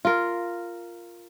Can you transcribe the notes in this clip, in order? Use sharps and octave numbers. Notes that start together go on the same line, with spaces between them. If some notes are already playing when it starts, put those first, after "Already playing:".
F4 A#4